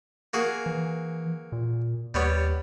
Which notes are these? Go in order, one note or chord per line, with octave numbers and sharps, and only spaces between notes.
A#3 F#4 G#4
E3
A#2
D#2 G3 B3 C#5